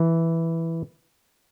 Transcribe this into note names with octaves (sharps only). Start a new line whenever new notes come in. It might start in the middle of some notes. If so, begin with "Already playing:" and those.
Already playing: E3